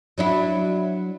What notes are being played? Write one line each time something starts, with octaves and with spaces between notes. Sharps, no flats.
F#3 D4 E4